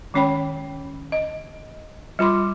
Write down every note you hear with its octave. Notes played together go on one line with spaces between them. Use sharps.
D#3 G#3 C#4 C#5 G5 B5
D#5
G3 F4 B5 C6 D6